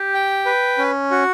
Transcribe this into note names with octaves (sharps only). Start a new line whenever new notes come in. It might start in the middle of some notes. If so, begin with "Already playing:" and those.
Already playing: G4
G5
B4
C#4
F#4